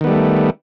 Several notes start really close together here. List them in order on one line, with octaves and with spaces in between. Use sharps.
D#3 B3 G3 A3